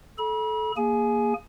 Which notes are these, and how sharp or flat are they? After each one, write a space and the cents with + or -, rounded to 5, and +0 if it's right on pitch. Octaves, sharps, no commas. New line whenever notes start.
A4 -25 B5 -40
A#3 +0 G#4 -15 G#5 +25